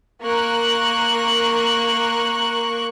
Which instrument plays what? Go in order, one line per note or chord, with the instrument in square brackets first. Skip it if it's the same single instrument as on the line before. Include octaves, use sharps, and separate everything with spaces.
[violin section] A#3 A#4 C#6 F#6